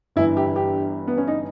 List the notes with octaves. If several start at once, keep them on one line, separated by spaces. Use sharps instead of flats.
G1 G2 E3 E4
G4
G4
B3
C#4
D#4